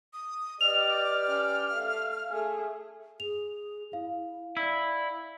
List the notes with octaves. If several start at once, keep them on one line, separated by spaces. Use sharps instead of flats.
D#6
G4 B4 D5 D#5 F6 F7
C#4 G5
A3 F5
A3 G#4
G#4 F7
E4 F5
E4 D5